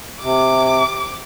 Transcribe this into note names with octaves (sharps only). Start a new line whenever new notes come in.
C3 D6